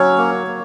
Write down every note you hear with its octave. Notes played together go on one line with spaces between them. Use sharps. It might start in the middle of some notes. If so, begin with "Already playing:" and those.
Already playing: F#3 C#4 C#5
A#3
A#3